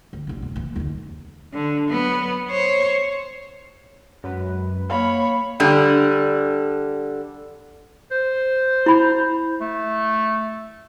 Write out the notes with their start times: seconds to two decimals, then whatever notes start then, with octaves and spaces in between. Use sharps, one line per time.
0.13 D2
0.27 F1 B1
0.42 C3
0.56 E3 A#3
0.76 D#2 D3
1.54 D3
1.88 F#3 B3
2.51 C5 C#5
4.24 F#2 G#3 B4
4.90 A#3 C#5 F5 B5
5.60 D3 G3 D4
8.11 C5
8.86 E4 B5
9.61 A3